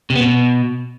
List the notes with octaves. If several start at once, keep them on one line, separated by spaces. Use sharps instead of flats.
C3
B3
B2